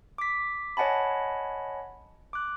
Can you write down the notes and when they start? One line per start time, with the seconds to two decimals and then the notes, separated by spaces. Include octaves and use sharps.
0.18 D6 B6
0.77 C#5 D#5 F#5 G#5 A5 B5
2.33 D6 F#6